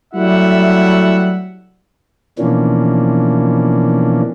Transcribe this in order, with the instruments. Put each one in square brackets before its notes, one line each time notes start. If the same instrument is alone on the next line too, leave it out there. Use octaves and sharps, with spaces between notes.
[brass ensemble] F#3 G3 A3 E4 E5 F#5
[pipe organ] B2 E3 F3 A#3 C#4 D4